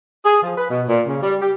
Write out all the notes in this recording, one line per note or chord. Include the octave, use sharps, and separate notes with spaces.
G#4
F3
B4
B2
A#2
C#3
G3
G4